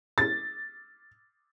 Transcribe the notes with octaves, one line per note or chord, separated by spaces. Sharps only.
A6